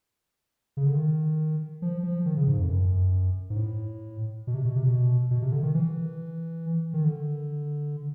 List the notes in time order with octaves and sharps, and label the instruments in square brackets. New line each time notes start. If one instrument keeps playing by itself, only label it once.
[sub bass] C#3
D3
D#3
F3
F3
D#3
C#3
G#2
F2
F#2
G#2
A2
B2
C3
B2
C3
B2
B2
C3
D3
D#3
E3
D#3
D3